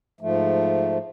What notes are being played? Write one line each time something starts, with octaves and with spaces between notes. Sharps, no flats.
G#2 F3 A3